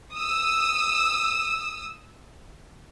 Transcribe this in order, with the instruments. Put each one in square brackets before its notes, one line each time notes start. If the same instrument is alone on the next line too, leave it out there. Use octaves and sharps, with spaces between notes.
[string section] D#6 E6